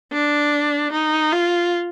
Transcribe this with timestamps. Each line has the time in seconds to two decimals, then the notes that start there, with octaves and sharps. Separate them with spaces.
0.12 D4
0.92 D#4
1.32 F4